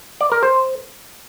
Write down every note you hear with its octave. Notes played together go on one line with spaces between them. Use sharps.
D5
A#4
C5